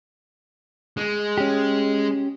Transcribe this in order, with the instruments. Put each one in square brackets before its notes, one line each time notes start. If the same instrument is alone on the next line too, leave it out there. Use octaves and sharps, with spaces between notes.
[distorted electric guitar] G#3
[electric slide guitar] C#4 G4